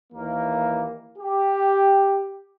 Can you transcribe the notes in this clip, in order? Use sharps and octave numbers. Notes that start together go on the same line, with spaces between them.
D#2 E3 A#3
G4